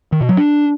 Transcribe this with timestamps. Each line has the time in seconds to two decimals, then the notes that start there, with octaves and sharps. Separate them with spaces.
0.12 D#3
0.21 B2
0.29 F#3
0.37 D4